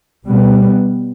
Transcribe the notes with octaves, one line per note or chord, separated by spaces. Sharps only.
B2 G3 B3